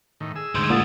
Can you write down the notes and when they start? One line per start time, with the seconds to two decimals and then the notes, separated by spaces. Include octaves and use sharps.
0.20 A2 D#3
0.36 G#4 E6
0.55 D2 G#2 C6 G6 G#6
0.70 A#2 F#5 D#6 A6